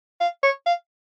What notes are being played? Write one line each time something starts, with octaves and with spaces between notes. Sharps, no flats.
F5
C#5
F5